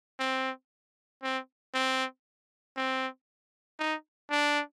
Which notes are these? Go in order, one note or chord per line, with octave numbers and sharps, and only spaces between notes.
C4
C4
C4
C4
D#4
D4